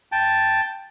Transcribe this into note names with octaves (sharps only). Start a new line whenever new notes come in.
G5 A5